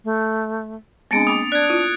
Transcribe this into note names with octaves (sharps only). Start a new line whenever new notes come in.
A3
G#3 B3 C4 D4 A6 C#7 D7
A#3 B5 D6 D#6
D4 D5 F#6 G#6
E4 F4